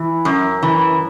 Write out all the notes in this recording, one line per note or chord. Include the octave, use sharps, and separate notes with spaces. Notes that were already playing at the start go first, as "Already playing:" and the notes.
Already playing: E3
F#2
E3